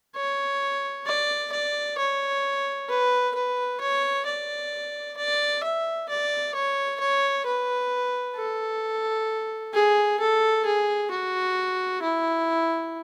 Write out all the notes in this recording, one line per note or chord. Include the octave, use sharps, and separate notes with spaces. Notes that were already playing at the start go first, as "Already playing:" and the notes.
C#5
D5
D5
C#5
B4
B4
C#5
D5
D5
E5
D5
C#5
C#5
B4
A4
G#4
A4
G#4
F#4
E4